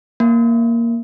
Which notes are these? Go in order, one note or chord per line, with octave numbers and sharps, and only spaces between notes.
A#3